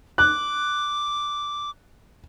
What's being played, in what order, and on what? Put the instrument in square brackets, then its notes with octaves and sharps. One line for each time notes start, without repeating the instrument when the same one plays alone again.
[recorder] D6 [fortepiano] F#6